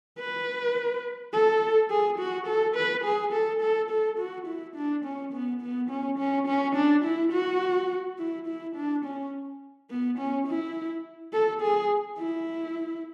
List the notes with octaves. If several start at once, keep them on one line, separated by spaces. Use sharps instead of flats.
B4
A4
G#4
F#4
A4
B4
G#4
A4
A4
A4
F#4
E4
D4
C#4
B3
B3
C#4
C#4
C#4
D4
E4
F#4
E4
E4
D4
C#4
B3
C#4
E4
A4
G#4
E4